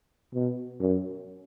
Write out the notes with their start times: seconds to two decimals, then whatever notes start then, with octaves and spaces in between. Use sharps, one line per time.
0.34 B2
0.80 F#2